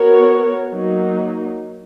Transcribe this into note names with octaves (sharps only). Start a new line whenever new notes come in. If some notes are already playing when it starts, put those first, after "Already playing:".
Already playing: B3 F#4 A#4 C#5
F#3 A#3 D#4